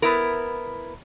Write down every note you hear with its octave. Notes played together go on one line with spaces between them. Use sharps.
B3 E4 A#4